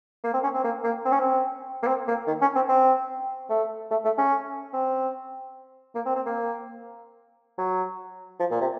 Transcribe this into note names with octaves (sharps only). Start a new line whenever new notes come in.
A#3
C4
C#4
C4
A#3
A#3
C4
C#4
C4
A#3
C4
A#3
D#3
C#4
C4
C4
A3
A3
A3
C#4
C4
A#3
C4
C4
A#3
F#3
F3
A#2
C3